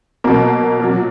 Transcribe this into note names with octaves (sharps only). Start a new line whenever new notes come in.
B2 F#3 A#3
A#2 F#3